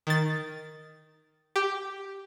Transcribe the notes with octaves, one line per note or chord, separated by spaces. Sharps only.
D#3 A6
G4